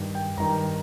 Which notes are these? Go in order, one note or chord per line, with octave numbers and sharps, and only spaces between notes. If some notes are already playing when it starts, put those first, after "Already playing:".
Already playing: G2 D#3
G5
G2 D#3 A#5